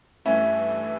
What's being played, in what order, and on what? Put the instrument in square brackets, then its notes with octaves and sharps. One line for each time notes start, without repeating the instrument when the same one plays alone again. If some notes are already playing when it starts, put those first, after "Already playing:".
[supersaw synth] G2 E3 A3 [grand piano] C#4 E4